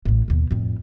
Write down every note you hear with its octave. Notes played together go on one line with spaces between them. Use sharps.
A1 A2
D#2 B2
F2 A2